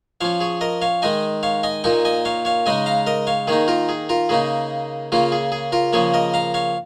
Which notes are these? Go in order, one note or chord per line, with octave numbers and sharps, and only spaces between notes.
F3 C#4 C#5 F5
G#4 C#5
A#4 D#5
C#5 F5
D#3 G#3 D#4 D#5 G#5
C#5 F5
D#5 G#5
A#2 A#3 D#4 G#5 C#6
D#5 G#5
C#5 F5
C#5 F5
C#3 G#3 D#4 D#5 G#5
F5 A#5
A#4 D#5
C#5 F5
D#3 A#3 D#4 G#4 C#5
F4 A#4
G#4
F4 A#4
C#3 A#3 D#4 G#4
C#3 A#3 C#4 F4
G#4
G#4
F4 A#4
C#3 F3 A#3 G#4 C#5
A#4 D#5
F5 A#5
C#5 F5